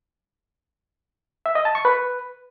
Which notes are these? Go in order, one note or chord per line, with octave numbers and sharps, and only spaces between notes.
E5
D#5
A5
C#6
B4